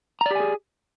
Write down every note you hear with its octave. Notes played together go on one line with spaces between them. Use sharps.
G4 G#4 D5 G#5 A#5